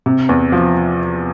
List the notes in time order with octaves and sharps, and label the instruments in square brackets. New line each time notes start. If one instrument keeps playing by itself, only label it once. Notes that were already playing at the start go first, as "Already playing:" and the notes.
[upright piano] C3
E2
F3